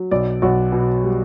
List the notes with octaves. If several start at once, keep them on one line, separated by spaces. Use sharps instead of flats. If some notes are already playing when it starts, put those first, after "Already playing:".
Already playing: F#3
B1 D5
B1 F#4
B2
G3